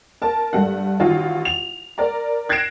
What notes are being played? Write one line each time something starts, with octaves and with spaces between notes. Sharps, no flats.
A#4 A5
G2 A3 F#5
A1 D#3 F4 F#4
F7
A#4 D5 A#5
F#6 G#6 A#6 C7 D7 E7